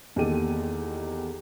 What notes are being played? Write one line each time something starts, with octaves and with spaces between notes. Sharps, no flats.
E2 D#3 A#3 G4 A4 D#7